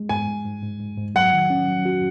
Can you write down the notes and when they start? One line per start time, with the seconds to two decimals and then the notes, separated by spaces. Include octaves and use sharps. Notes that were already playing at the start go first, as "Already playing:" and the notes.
Already playing: G#3
0.09 G#2 G#5
0.28 G#2
0.45 G#2
0.63 G#2
0.80 G#2
0.98 G#2
1.15 F#3 F#5
1.33 D#3
1.50 C#4
1.68 F#3
1.85 F#4